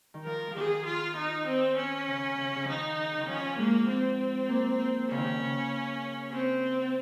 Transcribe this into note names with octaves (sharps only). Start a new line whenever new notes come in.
D#3
F3 A#4
F3
D#3 G#4
F4
D#4
C4
C#4
C#3
C#3
C#3
D#3 F3 D#4
C#3
D#3
F3 C#4
G#3 A#3
C4
A#3
C#3 C#4
D#3
C#3
C#3
C4